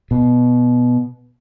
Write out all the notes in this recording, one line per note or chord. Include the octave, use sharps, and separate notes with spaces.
B2